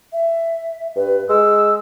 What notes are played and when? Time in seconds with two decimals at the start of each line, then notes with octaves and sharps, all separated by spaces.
0.13 E5
0.96 G2 B4
1.29 G#3 E6